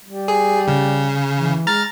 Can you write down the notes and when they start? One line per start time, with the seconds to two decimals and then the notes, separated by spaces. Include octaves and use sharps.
0.05 G3
0.28 G#4
0.68 C#3
1.39 E3
1.67 G#3 A#5 F6 A6